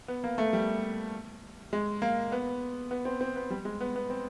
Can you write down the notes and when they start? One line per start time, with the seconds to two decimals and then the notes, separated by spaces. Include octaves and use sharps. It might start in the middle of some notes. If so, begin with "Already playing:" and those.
0.08 B3
0.24 A#3
0.38 A3
0.53 G3
1.73 G#3
2.02 A#3
2.32 B3
2.91 B3
3.05 C4
3.21 C4
3.36 B3
3.50 G3
3.65 G#3
3.81 B3
3.96 B3
4.10 C4